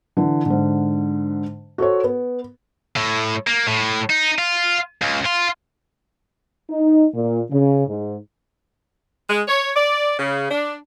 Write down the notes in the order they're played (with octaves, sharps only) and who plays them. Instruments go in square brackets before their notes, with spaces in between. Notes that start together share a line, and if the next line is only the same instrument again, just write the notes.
[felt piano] D3 E3
G#2 D3
F#4 A4 C5 C#5
B3
[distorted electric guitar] A2
A#3
A2
D#4
F4
C#2
F4
[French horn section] D#4
A#2
C#3
G#2
[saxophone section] G#3
C#5
D5
C#3
D4